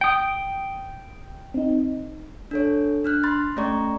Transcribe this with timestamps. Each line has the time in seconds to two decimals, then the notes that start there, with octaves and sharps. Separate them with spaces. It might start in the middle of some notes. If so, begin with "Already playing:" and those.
0.01 G5 D#6
1.54 C4 D#4
2.51 D4 A4 C#5
3.04 D4 F6 F#6
3.24 B5 C6 A6
3.57 A3 C#4 G4 D5 A#5 C#6